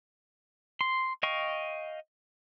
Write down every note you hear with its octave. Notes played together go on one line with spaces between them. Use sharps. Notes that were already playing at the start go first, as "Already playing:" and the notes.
C6
D#5 F5 G5 C#6